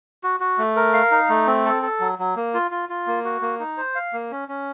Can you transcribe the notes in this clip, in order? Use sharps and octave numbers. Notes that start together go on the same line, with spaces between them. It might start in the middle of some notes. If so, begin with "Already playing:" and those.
F#4
F#4
A3
A#4
F5
D#4
A3
C4
A4
A4
F#3
F#3
A#3
F4
F4
F4
A#3
F#4
A#3
D#4
C5
F5
A#3
C#4
C#4